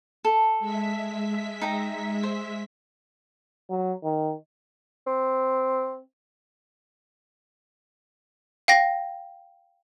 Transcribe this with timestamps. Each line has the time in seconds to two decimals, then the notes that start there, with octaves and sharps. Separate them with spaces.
0.25 A4
0.59 G#3 E5 B6
1.62 D#4 G5 A#5
2.23 C5
3.70 F#3
4.04 D#3
5.07 C4
8.68 F5 G5 A#6